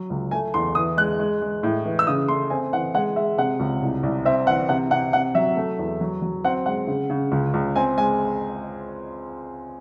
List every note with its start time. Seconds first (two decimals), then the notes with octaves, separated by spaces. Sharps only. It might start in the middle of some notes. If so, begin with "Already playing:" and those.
Already playing: F#3
0.10 C#2
0.31 A3 G#5
0.54 E2 C6
0.75 E3 D#6
0.97 G#3 F#6
1.19 G#3
1.42 G#3
1.63 A2
1.85 E3
1.99 E6
2.07 C#3 D#6
2.28 A3 C6
2.50 C4 G#5
2.73 E3 F#5
2.94 G#3 F#5
3.16 G#3 E5
3.38 C3 F#5
3.60 C#2
3.82 C2
4.03 C2
4.25 C4 E5
4.47 E3 F#5
4.69 C3 F#5
4.91 C3 F#5
5.13 C3 F#5
5.35 F#3 E5
5.56 A3
5.79 E2
6.01 F#3
6.22 F#3
6.44 C4 F#5
6.66 G#3 F#5
6.87 C#3
7.10 C#3
7.32 C#2
7.54 C#2
7.76 C4 G#5
7.97 G#3 G#5